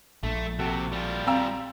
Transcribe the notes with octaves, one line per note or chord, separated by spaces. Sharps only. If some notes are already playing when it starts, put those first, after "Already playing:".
A#1 A3
C3 F#4 A4
G3 F4
C4 F5 G5 A#5 E6